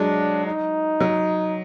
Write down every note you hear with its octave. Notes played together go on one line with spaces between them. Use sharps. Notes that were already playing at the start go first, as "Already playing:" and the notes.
Already playing: F#3 G#3 D4
D#4
F#3